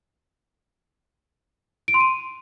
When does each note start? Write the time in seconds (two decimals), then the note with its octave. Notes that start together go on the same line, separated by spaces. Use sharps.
1.88 D7
1.94 C6
2.00 D#7